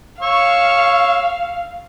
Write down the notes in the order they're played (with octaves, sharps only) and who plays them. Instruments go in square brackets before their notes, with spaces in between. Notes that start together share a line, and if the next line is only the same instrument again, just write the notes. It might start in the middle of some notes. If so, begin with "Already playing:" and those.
[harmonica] C#5 C#6 E6 [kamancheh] F5